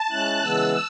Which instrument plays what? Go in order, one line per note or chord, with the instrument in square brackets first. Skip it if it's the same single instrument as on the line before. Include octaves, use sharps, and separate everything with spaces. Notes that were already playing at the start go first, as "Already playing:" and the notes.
Already playing: [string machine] A5
[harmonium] G#3 C#4 E4 [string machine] F#6
[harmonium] C#3 E3 G#3 B3 [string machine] E6